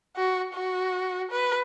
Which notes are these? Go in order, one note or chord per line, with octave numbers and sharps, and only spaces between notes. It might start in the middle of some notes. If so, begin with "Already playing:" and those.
F#4
F#4
B4